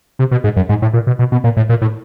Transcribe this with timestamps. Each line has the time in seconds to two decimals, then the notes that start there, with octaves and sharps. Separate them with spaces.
0.19 C3
0.31 B2
0.44 G#2
0.56 F#2
0.69 G#2
0.82 A2
0.94 A#2
1.07 B2
1.19 B2
1.32 B2
1.44 A#2
1.57 A2
1.69 A#2
1.82 A2